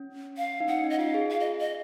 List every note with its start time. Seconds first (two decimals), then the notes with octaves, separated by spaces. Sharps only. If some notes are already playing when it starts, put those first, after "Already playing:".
Already playing: C#4
0.37 F5
0.60 D#4
0.68 C#4 F#5
0.84 D#4
0.90 D#5
0.98 F4 F5
1.14 G#4
1.30 F5
1.40 D#5
1.60 D#5